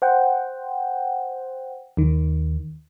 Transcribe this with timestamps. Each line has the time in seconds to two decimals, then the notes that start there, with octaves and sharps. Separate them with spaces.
0.02 C5 F#5 G5
1.97 D#2 D#3